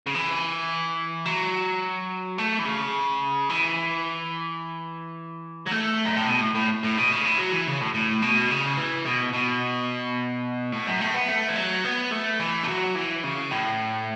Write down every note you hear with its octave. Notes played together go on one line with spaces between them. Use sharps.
C#3
E3
F#3
A3
E3
C#3
E3
F#3
A3
F#2
A2
B2
A2
A2
A2
B2
C#3
E3
F#3
E3
C#3
A2
A2
B2
C#3
E3
B2
B2
A2
F#2
A2
B3
A3
E3
F#3
B3
A3
E3
A3
F#3
E3
C#3
A2